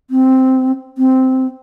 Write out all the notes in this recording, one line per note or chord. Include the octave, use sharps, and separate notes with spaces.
C4
C4